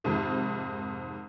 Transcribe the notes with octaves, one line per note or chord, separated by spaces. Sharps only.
F2 G#2 C3 D#3